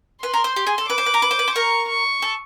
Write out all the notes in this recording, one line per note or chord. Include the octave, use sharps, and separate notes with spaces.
B4 C6
A#4
C5
G4
G#4
A4
B4 D6
C5
B4
A#4
B4
C5
B4
C5
A#4 C#6
C#6
A4